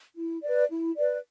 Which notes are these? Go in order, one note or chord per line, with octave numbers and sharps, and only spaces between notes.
E4
B4 D5
E4
B4 D5